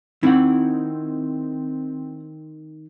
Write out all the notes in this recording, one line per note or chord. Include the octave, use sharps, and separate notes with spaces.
D#3 C4 E4 F#5